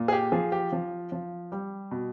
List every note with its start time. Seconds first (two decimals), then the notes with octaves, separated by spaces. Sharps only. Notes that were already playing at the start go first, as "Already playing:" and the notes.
Already playing: A#2
0.08 G#4
0.13 G4
0.32 F3 G#4
0.52 G4
0.72 F3
1.12 F3
1.52 G3
1.91 B2